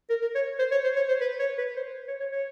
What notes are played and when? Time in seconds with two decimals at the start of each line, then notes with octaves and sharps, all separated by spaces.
0.10 A#4
0.22 A#4
0.35 C#5
0.59 C5
0.71 C#5
0.84 C5
0.96 C#5
1.08 C5
1.21 B4
1.39 C#5
1.58 B4
1.76 C5
2.08 C#5
2.20 C#5
2.32 C#5